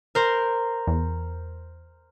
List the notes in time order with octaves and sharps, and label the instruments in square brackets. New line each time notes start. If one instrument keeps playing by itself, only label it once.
[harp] A#4 C5
[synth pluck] E2